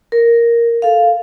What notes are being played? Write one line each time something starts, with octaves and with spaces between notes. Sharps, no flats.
A#4
A4 F5